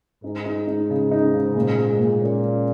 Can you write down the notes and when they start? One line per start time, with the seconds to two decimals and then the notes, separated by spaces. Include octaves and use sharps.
0.24 G#2 D#4
0.46 D#4
0.57 G#2
0.67 D#4
0.90 C#3
1.11 D#4
1.33 C#3
1.56 A#2
1.77 G#3
2.00 A#2
2.21 A#2 C#4
2.44 C#4